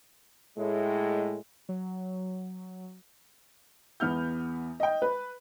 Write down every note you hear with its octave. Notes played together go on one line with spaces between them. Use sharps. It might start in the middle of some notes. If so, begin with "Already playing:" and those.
A2 G#3
F#3
E2 B3 F6 G6
D#5 G5
B4